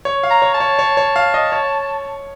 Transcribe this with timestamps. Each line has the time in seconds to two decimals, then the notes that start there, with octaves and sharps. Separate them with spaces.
0.05 C#5
0.23 F5
0.30 A#5
0.42 C#5
0.54 A5
0.60 C#5
0.79 C#5
0.97 C#5
1.16 F5
1.34 D#5
1.52 C#5